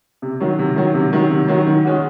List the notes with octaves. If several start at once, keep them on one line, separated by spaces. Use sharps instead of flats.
C3
D#3 F#3
C3
D#3 F#3
C3
D#3 F#3
C3
D#3 F#3
D#3
G#3 C#4 F#4